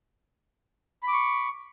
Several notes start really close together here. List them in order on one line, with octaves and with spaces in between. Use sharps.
B5 D6 C#6